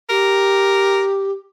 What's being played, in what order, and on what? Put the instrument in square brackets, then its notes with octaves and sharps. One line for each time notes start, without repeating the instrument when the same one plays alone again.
[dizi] G4 [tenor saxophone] A#4